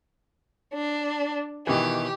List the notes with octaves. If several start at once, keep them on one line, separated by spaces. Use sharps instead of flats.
D4
B2 D#3 E3 G4